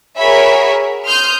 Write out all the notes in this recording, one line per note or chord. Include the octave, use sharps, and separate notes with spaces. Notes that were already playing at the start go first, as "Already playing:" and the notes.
F#4 G#4 A#4 C#5 E5 B5
C6 D#6 F6 G6